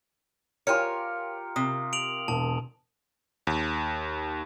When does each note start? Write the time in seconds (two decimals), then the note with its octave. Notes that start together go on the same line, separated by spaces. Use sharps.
0.67 F4 G4 A#4 C#5 G#5 C#7
1.56 C3 D#6
1.93 D7 F7 F#7
2.28 E1 A5
3.47 D#2